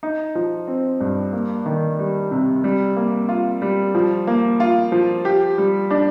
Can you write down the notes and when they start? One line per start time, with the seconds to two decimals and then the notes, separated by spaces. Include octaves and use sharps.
0.03 D#4
0.35 F3
0.68 C4
1.01 G2
1.33 A#3
1.66 D#3
1.99 G3
2.31 C3
2.64 G3
2.97 A#3
3.29 F4
3.62 G3
3.95 F3
4.27 A#3
4.60 F4
4.92 F3
5.25 G4
5.58 G3
5.91 D4